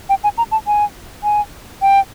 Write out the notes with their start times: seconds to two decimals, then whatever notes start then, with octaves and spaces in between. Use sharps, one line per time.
0.09 G5
0.24 G#5
0.38 A#5
0.51 A5
0.67 G#5
1.24 G#5
1.82 G5